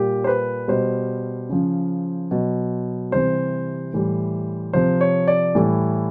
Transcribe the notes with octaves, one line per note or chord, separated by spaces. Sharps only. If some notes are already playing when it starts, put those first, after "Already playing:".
Already playing: A#2 G3 G4
C5
B4
B2 G3 C5
C#3 F3
B2 F#3
C3 E3 G3 C5
A2 E3 G3
C3 F3 C5
C#5
D5
A2 E3 G3